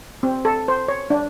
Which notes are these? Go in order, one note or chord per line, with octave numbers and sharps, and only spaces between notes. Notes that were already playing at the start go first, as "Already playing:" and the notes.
C4
A4
C5
C#5
D4